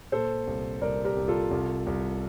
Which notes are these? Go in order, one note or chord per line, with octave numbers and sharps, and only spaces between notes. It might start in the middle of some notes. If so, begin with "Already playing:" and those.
A#2 A4 C5
C2
C2 A#4 D5
G4 A#4
C2
F4 A4
C2
C2